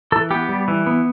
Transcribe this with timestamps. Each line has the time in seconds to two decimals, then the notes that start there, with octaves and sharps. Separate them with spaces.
0.12 E3 A4
0.31 B3 G4
0.49 G3
0.68 E3
0.87 B3